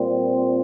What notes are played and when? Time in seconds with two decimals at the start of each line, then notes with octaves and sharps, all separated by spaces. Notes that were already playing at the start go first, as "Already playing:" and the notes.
Already playing: A#2 G3 C4